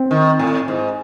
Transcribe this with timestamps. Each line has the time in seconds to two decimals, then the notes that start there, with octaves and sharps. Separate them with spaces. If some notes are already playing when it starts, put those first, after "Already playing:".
Already playing: C4
0.11 D#3
0.39 A2
0.68 G#2